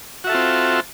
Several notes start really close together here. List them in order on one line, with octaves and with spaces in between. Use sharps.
F#4 E5 A4 F4 C4